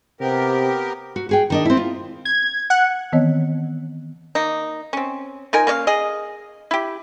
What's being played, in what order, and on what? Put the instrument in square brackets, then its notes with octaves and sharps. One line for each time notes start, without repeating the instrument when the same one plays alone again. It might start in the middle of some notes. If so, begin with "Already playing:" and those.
[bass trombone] C3 [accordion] B3 G4 A#4
[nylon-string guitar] F#4
F#4 G#4 G5
D#3 D4 D#5
C4 E4
F4
[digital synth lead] G#6
F#5
[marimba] D#3 E3 B3 C4 C#5 D#5
[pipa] A#3 D#4
C4 C#4
F3 D#4 A#4 G#5
A#3 C#4 D5 F5
G#4 D#5
E4 G4